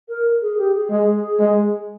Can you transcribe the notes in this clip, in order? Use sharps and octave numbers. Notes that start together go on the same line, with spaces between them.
A#4
G#4
G4
G#4
G#3
G#3